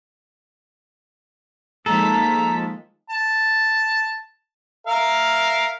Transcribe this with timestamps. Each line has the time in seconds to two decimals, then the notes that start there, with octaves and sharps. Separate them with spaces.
1.86 D#3 F3 G#3 A#3 A4 A#5 B6
3.10 A5
4.87 A#4 E5 F5